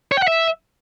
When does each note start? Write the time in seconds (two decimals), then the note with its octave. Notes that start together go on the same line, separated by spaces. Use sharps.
0.12 C#5
0.17 G5
0.22 F#5
0.28 E5